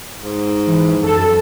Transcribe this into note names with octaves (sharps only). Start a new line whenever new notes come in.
G#2
E3
F#2 A4